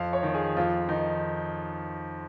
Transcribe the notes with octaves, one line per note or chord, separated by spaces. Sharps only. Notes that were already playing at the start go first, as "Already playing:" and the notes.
Already playing: F2 F5
C#5
D#3
G#4
F2 F4
D#3 D#4